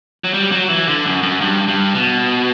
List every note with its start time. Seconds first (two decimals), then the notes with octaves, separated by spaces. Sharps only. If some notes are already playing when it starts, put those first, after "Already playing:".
0.24 F#3
0.34 G3
0.52 F#3
0.69 E3
0.87 D3
1.05 F#2
1.23 F#2
1.41 G2
1.68 G2
1.95 B2